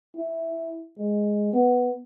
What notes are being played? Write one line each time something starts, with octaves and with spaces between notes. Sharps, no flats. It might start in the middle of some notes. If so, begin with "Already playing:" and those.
E4
G#3
B3